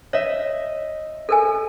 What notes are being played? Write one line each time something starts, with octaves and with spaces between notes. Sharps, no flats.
C#5 D#5 E5
A4 A#4 G#5